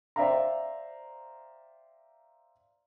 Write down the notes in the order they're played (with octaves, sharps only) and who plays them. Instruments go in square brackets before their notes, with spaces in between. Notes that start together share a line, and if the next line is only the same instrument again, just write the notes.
[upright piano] C5 D5 E5 F5 G5 A#5